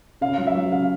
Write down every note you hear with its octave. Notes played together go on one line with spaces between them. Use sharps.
C#3 F5
F#3
E5
F#3
C#3 F5